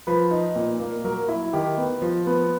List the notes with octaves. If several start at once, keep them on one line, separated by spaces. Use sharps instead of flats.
F3 B4
D#4
A#2
A#3
F#3 A#4
E4
D#3 G4
B3
F3
B3